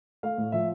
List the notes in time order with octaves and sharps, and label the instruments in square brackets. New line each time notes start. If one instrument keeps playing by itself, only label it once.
[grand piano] A3 F5
A2
F3 E5